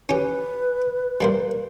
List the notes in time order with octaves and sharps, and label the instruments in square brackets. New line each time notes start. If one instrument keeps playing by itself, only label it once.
[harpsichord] C#4 G4 [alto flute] B4
[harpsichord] G3 A#3 C5